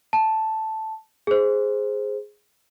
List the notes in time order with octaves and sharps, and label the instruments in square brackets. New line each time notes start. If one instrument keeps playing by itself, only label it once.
[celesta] A5
G#4 C5